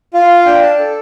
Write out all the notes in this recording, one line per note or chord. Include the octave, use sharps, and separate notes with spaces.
F4 F5
F5
D4 G5
A5
A4